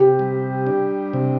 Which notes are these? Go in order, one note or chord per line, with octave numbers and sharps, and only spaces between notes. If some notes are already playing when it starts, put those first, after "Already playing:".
Already playing: C3 G4
G3
D4
C3